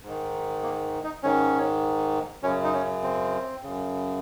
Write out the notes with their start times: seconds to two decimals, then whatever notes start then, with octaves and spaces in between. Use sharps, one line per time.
0.03 G#2 D#3
0.63 A#3
1.04 D#4
1.23 G#2 D#3 C#4
2.43 F#2 C#3 C#4
2.64 D#4
2.73 C#4
3.03 C4
3.63 F#2 C#3